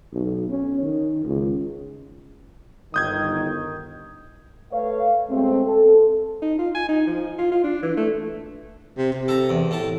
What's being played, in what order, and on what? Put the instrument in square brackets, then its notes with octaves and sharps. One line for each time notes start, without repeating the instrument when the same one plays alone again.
[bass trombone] B1
C#4
D#3
C#2
[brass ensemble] G1 D#3 [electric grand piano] D#6 G6 G#6
[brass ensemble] A3 B4 C#5 F5
B2 G#3 A3 C4
A4
[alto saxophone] D#4
F4
G#5
D#4
F3
F4
F4
D4
E3
A3
[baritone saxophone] C3
C3
[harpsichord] A4 A#5
E2
A2 A5